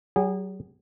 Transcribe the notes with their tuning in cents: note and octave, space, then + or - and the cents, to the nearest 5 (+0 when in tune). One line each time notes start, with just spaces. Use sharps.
F#3 +35 G#4 -30